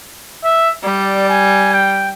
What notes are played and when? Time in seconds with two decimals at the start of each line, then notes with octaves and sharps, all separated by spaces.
0.44 E5
0.84 G3 D5
1.29 G#5
1.73 G5